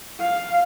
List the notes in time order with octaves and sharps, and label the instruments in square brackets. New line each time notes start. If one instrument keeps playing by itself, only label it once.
[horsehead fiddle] F5